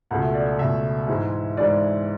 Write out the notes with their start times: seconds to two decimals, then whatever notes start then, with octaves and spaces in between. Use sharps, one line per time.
0.11 C#2 B2 A3 F#5
0.22 E5
0.34 D5
0.46 E5
0.59 C#2 B2 A3 E5
1.08 G#2 E3 G#3
1.57 G#2 E3 G#3 D5